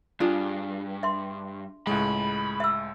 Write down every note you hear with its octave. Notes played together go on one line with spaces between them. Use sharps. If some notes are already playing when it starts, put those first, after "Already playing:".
G2 D4 F4 G#4
E5 C6
C#2 A2 G#3 B5
E5 E6